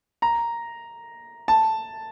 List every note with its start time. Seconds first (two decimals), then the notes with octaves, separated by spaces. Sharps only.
0.22 A#5
1.48 A5